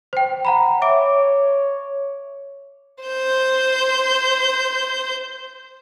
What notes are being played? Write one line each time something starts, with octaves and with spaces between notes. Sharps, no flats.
C5 G5
F#5 A#5 B5
C#5 E5 D6 D7
C5 G6